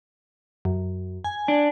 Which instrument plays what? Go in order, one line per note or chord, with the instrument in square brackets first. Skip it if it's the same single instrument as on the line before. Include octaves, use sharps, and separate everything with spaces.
[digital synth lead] F#2
G#5
[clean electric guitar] D4